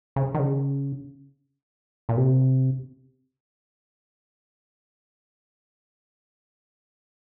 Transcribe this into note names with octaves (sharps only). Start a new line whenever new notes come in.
C#3
D#3
C#3
A#2
C3